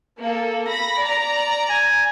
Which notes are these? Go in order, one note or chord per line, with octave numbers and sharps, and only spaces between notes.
A#3 A4
B5 A#6
D5 A#5
G#5